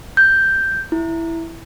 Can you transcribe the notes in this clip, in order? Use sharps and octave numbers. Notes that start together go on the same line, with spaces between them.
G6
E4